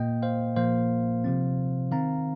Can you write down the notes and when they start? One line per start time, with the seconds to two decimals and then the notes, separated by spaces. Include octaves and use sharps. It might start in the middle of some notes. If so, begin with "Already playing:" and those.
Already playing: A#2 A#3 D#5 G5
0.23 C5 F5
0.56 A#2 F3 A#3 C5 F5
1.24 C3 F3 C4
1.91 D#3 C4 F5 A#5